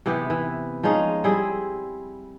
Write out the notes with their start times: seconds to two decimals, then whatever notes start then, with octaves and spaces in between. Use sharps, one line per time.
0.06 C3 E3 B3 G4
0.30 E3
0.83 F3 G#3 C#4 D#4
1.24 G3 C4 E4 G#4